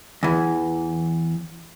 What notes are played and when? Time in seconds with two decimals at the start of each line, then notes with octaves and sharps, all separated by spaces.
0.23 E2 E3